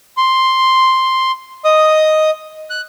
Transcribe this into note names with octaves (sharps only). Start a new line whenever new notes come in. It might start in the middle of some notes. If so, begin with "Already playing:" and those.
C6
D#5 D#6
F#6